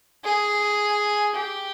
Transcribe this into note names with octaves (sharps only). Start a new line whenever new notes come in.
G#4
G4